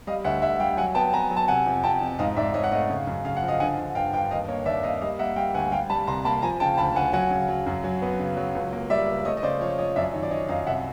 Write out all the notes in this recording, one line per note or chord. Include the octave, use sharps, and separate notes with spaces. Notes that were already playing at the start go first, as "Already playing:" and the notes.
G3 D#5 F5
D2 E5 F#5
D2 E5 F#5
G3 F5 G5
F#3 F#5 G#5
B3 G5 A5
B3 G#5 A#5
F#3
A5
C3 F#5 G#5
F2
F2 G5 A5
F2
G#2 D#5 F5
G#2 D5 E5
G#2 C#5 D#5
F#5
A3 D#5 F5
C#3
F#2
C#3 F5
F#5
F3
D#5 F5
D3 F#5 G#5
D3
G2 F5 G5
G2 F5 G5
D#2 D#5 F5
A#3 C#5
D#2 D5 E5
A#3 D#5 F5
G3 D#5 F5
A#3 E5 F#5
G3 F5 G5
D2 F#5 G#5
G3 F5 G5
G3 A5 B5
C2 A#5 C6
A#3 A5 B5
F3 G#5 A#5
C#3 G5 A5
D2 A5 B5
D2 F#5 G#5
F#3 F#5 G#5
C#3
F#3
F#2
F#3
B3
C#3
F#3
C#2
A#3
G3 D5 E5
C#2
A3 C#5 D#5
D#5
C#3 C5 D5
F3 C#5
F3 C#5 D#5
F#2 D5 E5
D#3 C#5
D5
D#3 C#5 D#5
F#2 D#5 F5
C2 E5 F#5